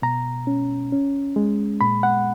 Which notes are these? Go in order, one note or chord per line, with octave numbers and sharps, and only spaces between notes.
B2 A#5
C#4
C#4
G#3
A#2 B5
F#5